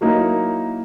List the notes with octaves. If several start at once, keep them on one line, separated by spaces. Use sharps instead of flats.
F#3 A#3 D#4 E4 A#4